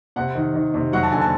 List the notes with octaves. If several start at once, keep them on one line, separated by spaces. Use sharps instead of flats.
C3 F#5
D#3
D#3
C3
F#3 F#5
A5
D3 G#5
A5